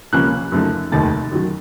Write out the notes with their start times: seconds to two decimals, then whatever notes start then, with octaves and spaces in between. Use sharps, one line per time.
0.13 C#2 C3 F3 A#3 C#4 F#6
0.52 F#2 C#3 F3 A3 D#4
0.92 F1 D#2 D#3 A3 D#4 A6
1.32 F#2 D#3 F#3